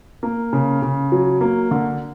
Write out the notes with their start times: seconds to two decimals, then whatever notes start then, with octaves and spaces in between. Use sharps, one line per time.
0.23 A#3
0.53 C#3
0.82 C#3
1.12 F#3
1.41 A#3
1.71 D3